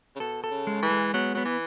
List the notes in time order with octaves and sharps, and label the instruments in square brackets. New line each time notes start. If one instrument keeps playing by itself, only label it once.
[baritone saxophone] C#3
[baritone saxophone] B2 [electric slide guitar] A4
[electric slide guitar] A4
[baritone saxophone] C#3
[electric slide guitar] G#3
[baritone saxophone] E3
[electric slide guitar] G#3
[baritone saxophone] F#3 [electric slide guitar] B3
[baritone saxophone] F#3 [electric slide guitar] B3
[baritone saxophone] E3